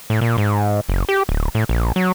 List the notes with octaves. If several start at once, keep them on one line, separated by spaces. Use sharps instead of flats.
A2
A#2
G#2
F#1
G4
D1
A2
A#1
F#3